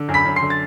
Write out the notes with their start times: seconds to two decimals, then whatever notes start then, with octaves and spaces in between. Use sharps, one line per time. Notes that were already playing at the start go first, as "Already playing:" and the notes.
Already playing: D3
0.09 F#2
0.14 B5 B6
0.25 F#2
0.36 C6 C7
0.41 D3
0.50 A6